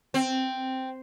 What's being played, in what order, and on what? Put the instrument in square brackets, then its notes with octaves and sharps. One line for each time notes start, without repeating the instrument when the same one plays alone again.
[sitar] C4